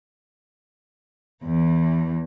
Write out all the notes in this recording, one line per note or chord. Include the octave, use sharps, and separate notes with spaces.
E2 E3